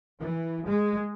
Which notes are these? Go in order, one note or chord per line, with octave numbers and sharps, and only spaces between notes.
E3
G#3